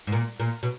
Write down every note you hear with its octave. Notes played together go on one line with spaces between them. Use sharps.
G#2
A#2
A#2
B2